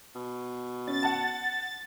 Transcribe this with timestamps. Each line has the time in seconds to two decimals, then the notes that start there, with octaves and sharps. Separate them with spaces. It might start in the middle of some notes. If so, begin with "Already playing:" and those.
0.15 B2
0.87 C#4 A6
1.03 F#5 A5